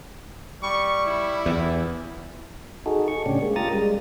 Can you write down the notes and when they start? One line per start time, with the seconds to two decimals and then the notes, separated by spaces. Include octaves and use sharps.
0.63 G3 C#6
1.06 E4
1.46 E2
2.86 D#4 F#4 G#4 A4
3.08 C#6
3.26 A2 C#3 C#4 D4 G4
3.41 G#3 A#3
3.56 F4 G4 A#4 A#5 D#6 A6
3.73 G3 G#3